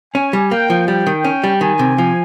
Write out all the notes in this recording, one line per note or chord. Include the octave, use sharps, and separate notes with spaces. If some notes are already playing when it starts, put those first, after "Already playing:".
C#4 G#5
G3
A#3 G5
F3
G3 G5
D#3
C#4
G3
D#3 G#5
C3
F3